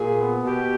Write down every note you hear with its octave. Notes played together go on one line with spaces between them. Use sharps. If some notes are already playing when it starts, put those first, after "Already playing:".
Already playing: A#2 G#4
B3
B2 G4